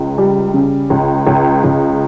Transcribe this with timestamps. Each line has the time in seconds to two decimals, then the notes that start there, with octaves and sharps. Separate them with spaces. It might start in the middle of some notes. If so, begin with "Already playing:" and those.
Already playing: C#2
0.18 G3
0.54 C#3
0.90 C#2
1.27 C#2
1.64 C#2